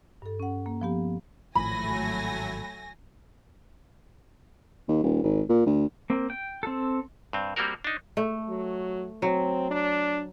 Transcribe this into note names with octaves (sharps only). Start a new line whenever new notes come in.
G2 A4
C#4 F#5
A#3
F3 B3 G4
G#1 A2 F3 F#3 A3 G#5 B5 A#6
D#2
D#1
G#1
A#2
D2
A#3 C4
G5
C4 A4
G2 C4
G3 A#3 C4 F#4 A#4
D4 D#4
A3
F#3
F#3 C4
D4